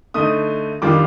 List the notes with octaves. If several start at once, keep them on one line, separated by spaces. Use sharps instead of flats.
D3 A3 D#4 D#6
F2 D#3 G3 D4 F4 D6